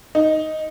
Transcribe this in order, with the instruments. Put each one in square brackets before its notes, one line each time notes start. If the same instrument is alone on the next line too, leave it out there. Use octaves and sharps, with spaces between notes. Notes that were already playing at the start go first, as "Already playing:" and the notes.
[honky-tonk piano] D#4